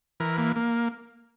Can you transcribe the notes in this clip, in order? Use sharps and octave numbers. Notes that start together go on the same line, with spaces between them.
E3 A#4
A#3
A#3